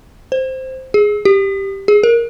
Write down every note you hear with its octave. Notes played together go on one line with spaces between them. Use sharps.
C5
G#4
G4
G#4
A#4